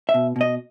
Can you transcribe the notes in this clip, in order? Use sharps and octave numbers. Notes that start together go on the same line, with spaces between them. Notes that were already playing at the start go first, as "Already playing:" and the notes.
E5
B2
B2 D#5